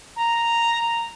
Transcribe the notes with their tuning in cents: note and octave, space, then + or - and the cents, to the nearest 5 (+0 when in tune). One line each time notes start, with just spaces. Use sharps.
A#5 -5